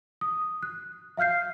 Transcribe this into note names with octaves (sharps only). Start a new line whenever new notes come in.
D#6
F#6
E5 F5 F6 G6 C7